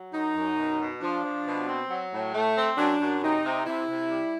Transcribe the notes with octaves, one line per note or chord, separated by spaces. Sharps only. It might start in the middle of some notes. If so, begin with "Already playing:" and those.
Already playing: F#3
F#2 D#4
F#2
B2
B2
F3 D4
F3
B2
C4
F#3
A2
A3
C4
F#2 D4
F#2
C3 D#4
C3
C3 E4
C3
G3